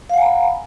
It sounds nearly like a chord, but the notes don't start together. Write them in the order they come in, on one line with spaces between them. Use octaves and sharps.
F5 F#5 G#5 A#5 B5